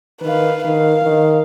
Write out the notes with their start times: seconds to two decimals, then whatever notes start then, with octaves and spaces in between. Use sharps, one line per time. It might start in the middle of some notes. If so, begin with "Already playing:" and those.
0.21 D#3 B4 F5
0.64 D#3 F5
1.03 D#3